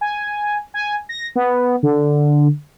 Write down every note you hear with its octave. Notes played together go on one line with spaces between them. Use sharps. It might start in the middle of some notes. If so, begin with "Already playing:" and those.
G#5
G#5
A#6
B3
D3